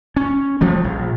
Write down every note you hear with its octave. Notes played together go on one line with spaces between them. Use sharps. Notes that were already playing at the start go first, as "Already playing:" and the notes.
C#4
F3 G3 A3
A#1